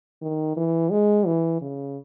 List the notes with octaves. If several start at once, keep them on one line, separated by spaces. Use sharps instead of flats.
D#3
E3
G#3
E3
C#3